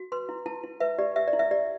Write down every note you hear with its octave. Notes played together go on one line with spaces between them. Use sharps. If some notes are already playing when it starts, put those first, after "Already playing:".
Already playing: F#4
B4 C6
E4
E4 A5
E4
B4 E5
G4 D5
G4 E5
D5
E4
E5
G4 D5